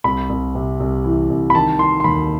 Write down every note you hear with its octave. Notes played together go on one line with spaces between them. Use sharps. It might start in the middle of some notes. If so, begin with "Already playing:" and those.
C2 B5
C2
C3
C2
E3
C2
B5
D#3 A5
D#3 C6
C6
D#2 B5